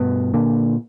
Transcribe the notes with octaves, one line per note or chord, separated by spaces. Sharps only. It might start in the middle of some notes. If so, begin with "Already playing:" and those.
Already playing: G2 B2 B3
A#2 D3 A#3